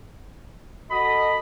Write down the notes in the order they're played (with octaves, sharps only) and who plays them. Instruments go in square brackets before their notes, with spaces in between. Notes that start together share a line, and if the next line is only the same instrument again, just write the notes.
[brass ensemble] F#4 A4 D#5 [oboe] B5